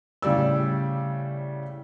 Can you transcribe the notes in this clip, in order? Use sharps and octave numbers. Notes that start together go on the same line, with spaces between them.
A2 C#3 G3 D5 E6